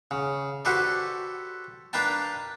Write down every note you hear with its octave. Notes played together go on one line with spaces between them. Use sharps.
C#3
F#4 G4 A4 B4 C5 D5
D4 A#4 B4 F5 G5 A5